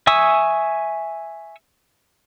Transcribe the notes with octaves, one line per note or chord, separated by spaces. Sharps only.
E5 G#5 C#6 D#6 E6